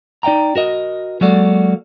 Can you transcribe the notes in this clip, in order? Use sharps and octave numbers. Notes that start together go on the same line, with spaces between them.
D#4 D5 F5 G5 A#5
F#4 A#4 D#5
F#3 G#3 A#3 F#4 A4 D5